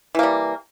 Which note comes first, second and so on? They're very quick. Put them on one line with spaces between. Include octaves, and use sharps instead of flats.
E3 A#3 G3